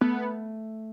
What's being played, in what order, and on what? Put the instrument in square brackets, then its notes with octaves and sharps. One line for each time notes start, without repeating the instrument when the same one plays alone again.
[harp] A3 [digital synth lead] B3